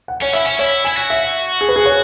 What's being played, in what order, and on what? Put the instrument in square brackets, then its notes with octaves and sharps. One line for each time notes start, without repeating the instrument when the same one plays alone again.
[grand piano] F#5
[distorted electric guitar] C#4 [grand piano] C#5
[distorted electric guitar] E4 [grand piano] E5
[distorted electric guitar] C#4
[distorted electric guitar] E4 [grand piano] C#5
[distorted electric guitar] E4 [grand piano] G#5
[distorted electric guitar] F#4
[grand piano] E5
G#4
B4
G#4
C#5